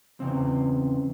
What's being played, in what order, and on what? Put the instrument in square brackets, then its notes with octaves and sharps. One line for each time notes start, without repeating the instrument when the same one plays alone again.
[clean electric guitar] E2 C#3 C4